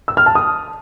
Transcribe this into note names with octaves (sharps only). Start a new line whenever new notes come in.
E6
F6
A5
D#6